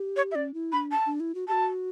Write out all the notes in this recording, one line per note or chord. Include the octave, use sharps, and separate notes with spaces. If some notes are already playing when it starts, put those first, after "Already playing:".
Already playing: G4
C#5
E5
C#4 D5
E4
D4 B5
A5
D4
E4
F#4
F#4 G4 A5